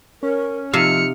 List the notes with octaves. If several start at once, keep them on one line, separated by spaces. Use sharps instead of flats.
C#4 A#4
C3 F3 D#4 E5 F5 F6 C#7